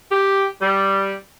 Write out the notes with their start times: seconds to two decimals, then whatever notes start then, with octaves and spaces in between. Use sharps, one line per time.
0.11 G4
0.62 G3